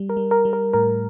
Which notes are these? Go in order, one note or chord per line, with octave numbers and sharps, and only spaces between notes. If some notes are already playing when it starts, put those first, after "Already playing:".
Already playing: G3
A#4
G3
A#4
G3
A#4
A2 A#4